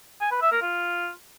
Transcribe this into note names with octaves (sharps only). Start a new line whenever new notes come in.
G#5
B4
E5
A#4
F4